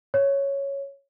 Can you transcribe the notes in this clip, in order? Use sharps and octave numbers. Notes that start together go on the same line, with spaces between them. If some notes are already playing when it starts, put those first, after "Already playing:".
C#5